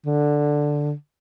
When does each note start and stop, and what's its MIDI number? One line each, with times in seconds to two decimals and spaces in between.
0.06 0.93 50